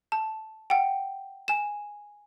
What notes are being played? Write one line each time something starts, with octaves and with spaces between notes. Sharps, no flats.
A5
F#5 G5
G#5 E7